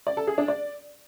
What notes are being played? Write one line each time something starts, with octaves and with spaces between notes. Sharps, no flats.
D5
A4
G#4
D4
D5